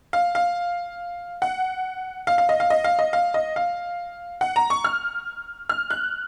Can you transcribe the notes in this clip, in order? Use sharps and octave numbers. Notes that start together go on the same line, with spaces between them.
F5
F5
F#5
F5
F5
D#5
F5
D#5
F5
D#5
F5
D#5
F5
F#5
A#5
C#6
F6
F6
F#6